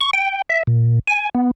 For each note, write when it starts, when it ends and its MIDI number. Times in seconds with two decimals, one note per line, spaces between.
0.01 0.11 85
0.13 0.42 79
0.49 0.63 76
0.67 0.99 46
1.08 1.29 80
1.35 1.51 59